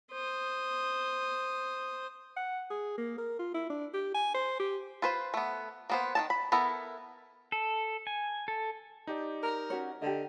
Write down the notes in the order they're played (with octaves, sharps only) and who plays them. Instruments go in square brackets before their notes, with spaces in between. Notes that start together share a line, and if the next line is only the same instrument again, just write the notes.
[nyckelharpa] C5 D#6
[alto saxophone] F#5
G#4
A#3
A#4
F4
E4
D4
G4
G#5
C5
G4
[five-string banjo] F4 B4 C5
A3 B3
A#3 B3 C5
D#3 F3 A5
B5
B3 E4 A4 A#4
[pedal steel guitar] A4
G#5
A4
[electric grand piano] D#4 G4 D5
[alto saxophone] A#4
[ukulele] C#4 F#4 C#5
[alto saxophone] D3 [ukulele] G4 D#5